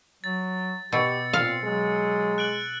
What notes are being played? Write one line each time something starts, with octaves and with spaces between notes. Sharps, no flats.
F#3 A6
B2 G4 E6 A6 C#7
A#2 C4 F5
F#3 G#3
F#6 D7 F#7